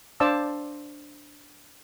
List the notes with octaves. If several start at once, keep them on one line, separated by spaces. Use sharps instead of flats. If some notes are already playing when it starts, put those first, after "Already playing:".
D4 C5 D5 F5 A5 E6